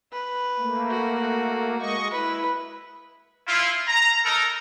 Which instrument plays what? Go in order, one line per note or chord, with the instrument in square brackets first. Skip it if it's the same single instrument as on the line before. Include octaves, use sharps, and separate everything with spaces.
[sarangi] B4
[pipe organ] A3 A#3
[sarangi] F#4
[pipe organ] G#3 D#5 C#6
[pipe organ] E4 [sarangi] B4
[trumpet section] E4 F4
A#5
D#4 A4 A#4 A#5